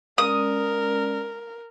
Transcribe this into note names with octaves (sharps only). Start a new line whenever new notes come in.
G#3 C#4 A#4 D5 D#6